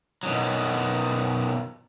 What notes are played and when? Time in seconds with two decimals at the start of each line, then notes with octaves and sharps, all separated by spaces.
0.23 B2 D#3 F#3